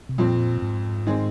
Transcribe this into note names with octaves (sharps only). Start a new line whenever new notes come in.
C3
F2 A#2 F3 C4
G#2
D#3 G#3 C4 G#4